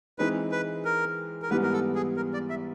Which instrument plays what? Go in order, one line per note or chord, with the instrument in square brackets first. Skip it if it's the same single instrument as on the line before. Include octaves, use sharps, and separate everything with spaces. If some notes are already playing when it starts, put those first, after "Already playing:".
[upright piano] E3 G#3 C4 D#4 [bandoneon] B4
[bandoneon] B4
A#4
A#4
[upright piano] G#2 E3 G3 B3 [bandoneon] B4
[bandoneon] A#4
A4
G#4
A#4
D5
E5